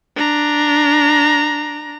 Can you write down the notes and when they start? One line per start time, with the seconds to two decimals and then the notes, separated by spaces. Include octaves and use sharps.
0.16 D4 A#5